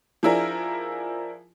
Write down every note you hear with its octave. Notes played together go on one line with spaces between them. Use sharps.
F3 D4 E4 G#4 A#4